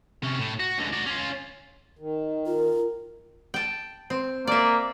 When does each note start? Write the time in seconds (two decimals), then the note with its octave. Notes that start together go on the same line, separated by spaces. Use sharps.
0.23 C3 C#4
0.39 A2
0.60 F#4
0.78 C#2 D3
0.93 F#4 D5
1.07 C#4 F4
1.99 D#3
2.46 F4 A#4
3.54 G5 A5
4.10 C4
4.47 A#3 D5 E5